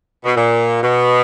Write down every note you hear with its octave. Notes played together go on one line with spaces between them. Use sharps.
B2
A#2
B2